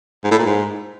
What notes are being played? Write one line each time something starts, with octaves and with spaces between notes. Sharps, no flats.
G#2
A2
A#2
G#2